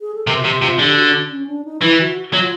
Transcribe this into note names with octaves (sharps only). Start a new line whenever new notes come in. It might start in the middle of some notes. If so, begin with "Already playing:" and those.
G#4
A4
C3 A#4
F#4
C3 G4
C3 F4
D3 G4
F#4
C#4
D4
D#4
E3 E4
F#4
F#4
F#3 F4